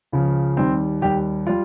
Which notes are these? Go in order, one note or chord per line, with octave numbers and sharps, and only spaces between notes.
C#2 C#3 F3
D#2 D#3 G3 C4
D#2 D#3 G3 G4
G3 F4